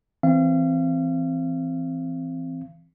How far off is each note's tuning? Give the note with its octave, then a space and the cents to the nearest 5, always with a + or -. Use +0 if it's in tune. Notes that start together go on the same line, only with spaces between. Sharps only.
E3 +0 C4 +0 F5 -40